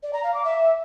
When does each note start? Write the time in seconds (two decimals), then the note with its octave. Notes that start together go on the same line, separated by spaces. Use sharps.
0.03 D5
0.13 A#5
0.24 F5
0.34 D6
0.44 E5